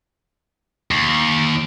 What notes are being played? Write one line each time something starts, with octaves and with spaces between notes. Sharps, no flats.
D#2